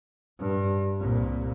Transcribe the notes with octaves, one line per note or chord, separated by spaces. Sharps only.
G2
C2 A#2